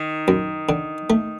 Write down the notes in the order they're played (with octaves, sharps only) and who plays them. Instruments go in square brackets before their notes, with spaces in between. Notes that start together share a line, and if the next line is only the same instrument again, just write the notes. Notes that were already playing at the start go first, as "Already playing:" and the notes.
Already playing: [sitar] D#3
[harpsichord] F#2
D3
A3